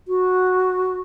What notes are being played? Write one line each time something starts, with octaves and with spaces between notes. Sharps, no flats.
F#4